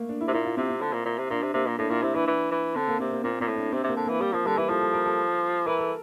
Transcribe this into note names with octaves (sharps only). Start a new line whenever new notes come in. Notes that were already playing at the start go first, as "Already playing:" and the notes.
Already playing: A3 A#3
D4
E4
C3
A#2 E4
F4
C3 C4
C4
D3
A#2
A#2
C3
A#2 D4
C3
C3 A#3
A#2
A2 D4
A#2 E4
C3 E4
E3 D4
E3
E3
D3 C4
A#3
C3 C4
A#3
A#2 C4
A#2 C4
A2
D4
C3 C4
C3 A#3
D3
E3 A#3
G3 A#3
F3 A#3
D3 G3
E3 E4
F3 A4
A4
A#4
A4
E3 A#4
A4